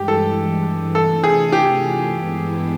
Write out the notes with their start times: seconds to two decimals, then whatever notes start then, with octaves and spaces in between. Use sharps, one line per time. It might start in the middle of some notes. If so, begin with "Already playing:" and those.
Already playing: G2 E3 G#3 G4
0.08 A4
0.94 C3 E3 A3 D4 F4 A4
1.24 G#4
1.52 G4
2.11 G2 E3 G#3 B3 E4